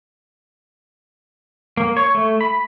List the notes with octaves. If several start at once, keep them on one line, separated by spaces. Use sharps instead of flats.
A#3
C#5
A3
B5